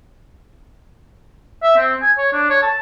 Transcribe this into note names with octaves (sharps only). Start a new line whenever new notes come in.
E5
C4
G#5
C#5
D4
C#5
A5